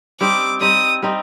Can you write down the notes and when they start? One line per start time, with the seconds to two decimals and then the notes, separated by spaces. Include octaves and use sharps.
0.20 G3 C4 D#4 D6
0.61 G3 C4 D#4 D#6
1.02 G3 C4 D#4